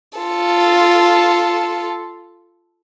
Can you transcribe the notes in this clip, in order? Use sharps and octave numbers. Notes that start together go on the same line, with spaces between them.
F4 A4